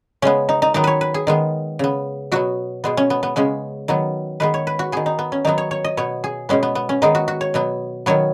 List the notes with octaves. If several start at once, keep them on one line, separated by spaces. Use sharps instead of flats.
C#3 G#3 B3 C#4
D#4
D#4
D#3 F#3 B3 D#4
B4 C#5
B4
G#4
D#3 G#3 B3
C#3 B3
B2 F#3 B3 F#4
B2 G#3 B3
C#4
B3
B3
C#3 G#3 B3 C#4
D#3 F#3 B3
D#3 G#3 B3 B4
C#5
B4
F#4
D#3 B3 G#4
D#4
B3
C#4
D#3 F#3 B3 D#4
C#5
C#5
D#5
B2 B3 C#5
G#4
B2 G#3 B3 C#4
B3
B3
C#4
D#3 G#3 B3 D#4
F#4
F#4
C#5
B2 F#3 B3
D#3 F#3 B3 C#5